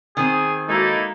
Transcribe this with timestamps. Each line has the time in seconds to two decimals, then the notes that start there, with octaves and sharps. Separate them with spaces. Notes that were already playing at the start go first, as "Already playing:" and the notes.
0.17 D#3 C4 G#4
0.68 G#3 A#3 D#4 E4 F#4 A4 G#6